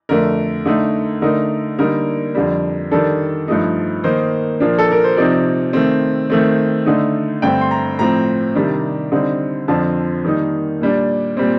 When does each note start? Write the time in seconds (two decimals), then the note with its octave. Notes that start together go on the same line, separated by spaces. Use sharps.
0.09 F2 D3 A3 A#4
0.66 D3 A3 D#4
1.22 D3 A3 D#4 A#4
1.79 D3 G3 A#3 D#4 A#4
2.35 F2 D3 G3
2.91 D#3 G3 D4 A4
3.48 G2 F3 A3 D#4
4.04 D#3 A#3 D#4 C5
4.60 A#2 F3 A#3 D4
4.78 A4
4.91 A#4
5.04 C5
5.17 C3 F3 C4 D#4 D5
5.73 D#3 A3 C4
6.30 D#3 A3 C4
6.86 D3 A3 D#4
7.42 G2 D3 A3 C4 G5
7.61 C6
7.71 A#5
7.99 A2 F3 C4 A#5
8.55 C3 D#3 G3 D4
9.12 D3 G3 C4 D#4
9.68 F2 D3 F3 C4 A5
10.25 D#3 G3 A#3 D#4
10.81 A#2 G3 D4
11.37 A#2 G3 C4